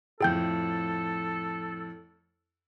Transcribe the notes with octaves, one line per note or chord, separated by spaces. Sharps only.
F2 A2 G#4 A4 G5 G6